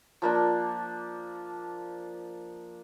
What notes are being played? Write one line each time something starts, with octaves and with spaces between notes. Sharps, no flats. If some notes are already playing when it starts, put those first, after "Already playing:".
F3 A#3 D4